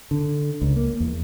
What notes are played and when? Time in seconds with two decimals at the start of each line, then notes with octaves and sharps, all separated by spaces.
0.11 D3
0.62 C#2
0.76 A#3
1.00 E2